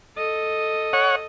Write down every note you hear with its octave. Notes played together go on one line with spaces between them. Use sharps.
A4 D#5
C#5 F#5